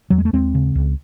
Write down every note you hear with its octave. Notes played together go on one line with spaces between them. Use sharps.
E2 F#3
G#3
A3
D#2 G#3 C4
C#3
C#2